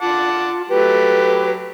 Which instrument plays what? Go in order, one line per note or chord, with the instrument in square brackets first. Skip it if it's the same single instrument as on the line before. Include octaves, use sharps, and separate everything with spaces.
[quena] F4 [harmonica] F#5 A5 D6
[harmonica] F#3 A3 G4 [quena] B4